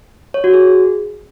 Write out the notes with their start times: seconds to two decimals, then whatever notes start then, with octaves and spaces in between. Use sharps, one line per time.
0.34 C#5
0.44 F#4
0.53 G#4